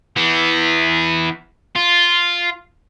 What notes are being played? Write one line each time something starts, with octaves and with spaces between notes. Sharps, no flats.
E3 B3
F4